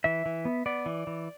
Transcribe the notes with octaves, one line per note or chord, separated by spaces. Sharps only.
E3 E5
E3
B3
B3 D5
E3
E3